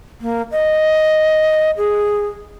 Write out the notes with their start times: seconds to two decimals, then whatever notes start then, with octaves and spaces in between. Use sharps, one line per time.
0.21 A#3
0.51 D#5
1.77 G#4